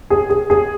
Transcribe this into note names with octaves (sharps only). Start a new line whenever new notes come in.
G#4
G#4
G#4